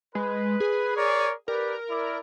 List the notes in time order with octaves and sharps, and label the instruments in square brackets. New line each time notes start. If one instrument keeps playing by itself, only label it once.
[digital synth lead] G#3 [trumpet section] B4
[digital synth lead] G#4
[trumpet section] A#4 C#5 D5
[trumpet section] G4 B4 D5 [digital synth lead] A#4
[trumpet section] E4 D5